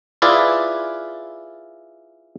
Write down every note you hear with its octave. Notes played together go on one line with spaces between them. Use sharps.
E4 F4 G#4 B4 D5